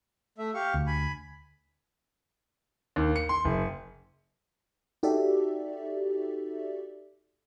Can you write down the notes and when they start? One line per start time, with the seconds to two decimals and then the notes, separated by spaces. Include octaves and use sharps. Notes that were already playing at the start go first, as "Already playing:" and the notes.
0.38 A3 E5
0.54 G4 F5 C#6
0.74 D2
0.87 G#5 B5
2.96 D#2
3.16 C#7
3.29 C6
3.45 F#1
5.03 D#4 F#4 G4 A4 D5 E5